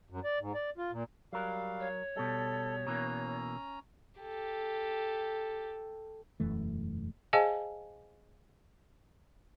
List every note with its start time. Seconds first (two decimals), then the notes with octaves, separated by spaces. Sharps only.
0.10 F#2
0.24 D5
0.40 G#2
0.55 D5
0.78 F4
0.92 A#2
1.33 F#3 G3 A#4 F5
1.80 C#5
2.16 B2 G3 A4
2.87 B2 E3 A#3 C#4 A#5
4.21 G4 A4
6.40 E1 F#2 E3 A3
7.33 G#4 C5 D#5 F5 G#5 A5